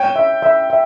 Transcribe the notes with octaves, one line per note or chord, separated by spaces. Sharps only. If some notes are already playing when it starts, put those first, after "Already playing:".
Already playing: C#5 G5
E5
E5
E5